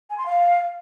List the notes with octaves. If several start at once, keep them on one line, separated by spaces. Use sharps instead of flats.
G#5
C6
F5